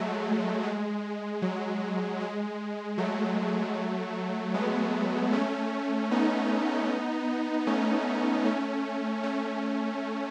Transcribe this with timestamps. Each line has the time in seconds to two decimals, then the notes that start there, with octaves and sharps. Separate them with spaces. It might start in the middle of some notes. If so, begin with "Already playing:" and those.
Already playing: F#3 G#3 A3
0.63 G#3
1.42 F#3
2.20 G#3
2.98 F#3 A3
4.54 G#3 B3
5.32 A3 C#4
6.11 B3 D#4
7.67 A3 C#4
8.45 A3 C#4
9.23 A3 C#4